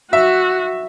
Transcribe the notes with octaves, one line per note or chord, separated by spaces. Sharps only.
F#4 E5